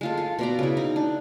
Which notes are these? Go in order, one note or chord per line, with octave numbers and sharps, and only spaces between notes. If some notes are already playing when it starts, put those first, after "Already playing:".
G#3 F4 A4
F4
B2 D5 A#5
C#3 E4
D#4
D4